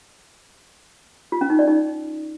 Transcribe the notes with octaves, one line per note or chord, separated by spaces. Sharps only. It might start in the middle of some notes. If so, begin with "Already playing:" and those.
F4
C#4
D#4
D5
D#4